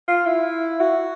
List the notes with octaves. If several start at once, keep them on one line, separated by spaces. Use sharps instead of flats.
F4
E4
F#4